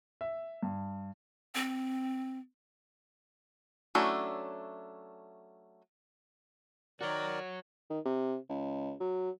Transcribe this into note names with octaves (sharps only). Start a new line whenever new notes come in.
E5
G2
C4
F#3 A3 C#4 D4 E4
D#3 F#4 A#4 C#5 D5
D#3
C3
C#2
F#3